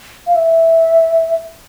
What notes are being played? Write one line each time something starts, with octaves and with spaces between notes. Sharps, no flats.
F5
E5